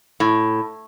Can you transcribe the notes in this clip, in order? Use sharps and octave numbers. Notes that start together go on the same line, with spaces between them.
A2